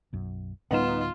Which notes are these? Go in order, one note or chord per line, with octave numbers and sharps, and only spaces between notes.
B1 F#2
D2 A2 G3 B3 D#4 F4 E7